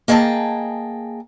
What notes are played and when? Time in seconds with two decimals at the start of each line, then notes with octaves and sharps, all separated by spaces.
0.08 A#3 G#4 D#5 G5 A5